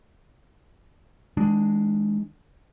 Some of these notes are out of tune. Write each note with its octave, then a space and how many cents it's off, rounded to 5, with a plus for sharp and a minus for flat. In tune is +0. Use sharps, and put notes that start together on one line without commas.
D#3 +45 G#3 +0 D4 +0